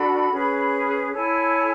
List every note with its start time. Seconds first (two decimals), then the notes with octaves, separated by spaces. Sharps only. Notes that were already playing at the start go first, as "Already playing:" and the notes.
Already playing: D4 F#4 A4 B5
0.30 C#4 G#4 B4
1.12 E4 A4 C#5 G#5